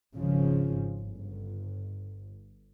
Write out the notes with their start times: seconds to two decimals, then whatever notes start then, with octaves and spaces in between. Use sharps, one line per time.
0.15 G#1 C#3 F3
1.00 G1